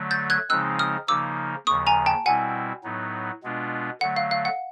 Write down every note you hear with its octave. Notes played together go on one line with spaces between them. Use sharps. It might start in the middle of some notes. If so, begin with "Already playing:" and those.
Already playing: D3 F#3 A3
G6 A6
F#6 G#6
C#3 F3 G#3 C4 D#4 E6 F#6
D#6 F6
C#3 F3 A#3 D#4 D6 E6
D#2 C#3 F3 C#6 D#6
G#5 A#5
G5 A5
B2 G3 C4 E4 F#5 G#5
A2 F#3 B3 D#4
B2 G#3 B3 D4 F4
D3 F#3 A3 F#5
F5
F5
F#5